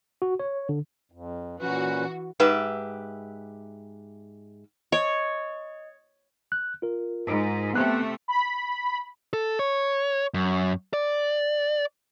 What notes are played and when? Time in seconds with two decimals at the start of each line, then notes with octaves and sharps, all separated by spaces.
0.22 F#4
0.39 C#5
0.69 D3
1.12 F2
1.60 A#2 E3 C#4 F#4 B4
2.40 G#2 G4 B4 E5
4.92 C#5 D#5
6.52 F#6
6.82 F4 A#4
7.26 G#2
7.74 C3 A3 B3 F#6
8.28 B5
9.33 A4
9.59 C#5
10.34 F#2
10.94 D5